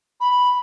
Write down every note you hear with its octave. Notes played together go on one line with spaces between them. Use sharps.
B5